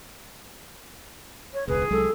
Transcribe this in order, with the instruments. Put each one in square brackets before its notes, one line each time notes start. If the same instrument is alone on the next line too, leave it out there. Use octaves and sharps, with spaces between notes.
[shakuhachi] C#5
[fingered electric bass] E1 C#2 [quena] G#4 [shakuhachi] B4
[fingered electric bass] C2 F#3 G#3 [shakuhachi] A4